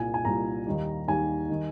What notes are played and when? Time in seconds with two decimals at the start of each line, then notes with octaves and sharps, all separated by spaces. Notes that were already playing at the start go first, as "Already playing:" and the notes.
Already playing: C2 A#2 G3 G#5
0.14 G#5
0.25 C2 A#2 G3 A#5
0.67 D#2 D#3 G3
1.08 D#2 D#3 G3 G#5
1.49 D#3 G3